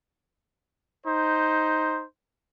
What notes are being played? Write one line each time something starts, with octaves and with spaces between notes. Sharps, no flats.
D#4 C5